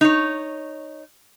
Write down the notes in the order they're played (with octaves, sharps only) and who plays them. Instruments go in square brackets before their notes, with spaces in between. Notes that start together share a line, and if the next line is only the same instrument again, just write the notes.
[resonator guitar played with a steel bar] D#4 C#5